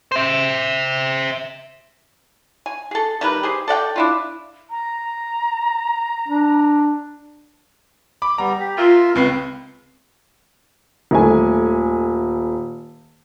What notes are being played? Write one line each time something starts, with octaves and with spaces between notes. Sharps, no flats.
C5 E5
G#5
G#4 A4
D#3 G3 B4 A#5
G4 G#4 C5
A4 D5 F#5 G5
D4 E4 F4
A#5
D4
B5 D6
G3 B3 A#5
G4
F4 A#4 E5 F5
C#2 C4 B4 C7
D#1 A3 G#5